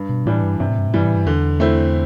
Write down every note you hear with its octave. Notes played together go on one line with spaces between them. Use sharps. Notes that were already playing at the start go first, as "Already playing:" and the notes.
Already playing: G2
B2
A2 E3 G3 D4
G2
G2 C3
A2
G2
A2
G2 E3 G3
A2
G2
E2 D3
A3 C4 E4